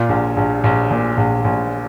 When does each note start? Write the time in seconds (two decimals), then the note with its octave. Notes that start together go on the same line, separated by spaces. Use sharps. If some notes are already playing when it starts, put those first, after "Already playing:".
Already playing: A#2 F4
0.09 A#1
0.37 A#1
0.64 A#1
0.91 A#2
1.17 A#1
1.45 A#1